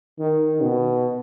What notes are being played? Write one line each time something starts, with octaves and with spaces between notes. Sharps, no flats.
D#3
B2